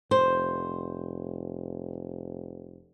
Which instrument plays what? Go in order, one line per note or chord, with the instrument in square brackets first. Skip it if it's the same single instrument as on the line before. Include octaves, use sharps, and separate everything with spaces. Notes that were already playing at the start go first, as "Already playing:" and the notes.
[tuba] F1 [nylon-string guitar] C5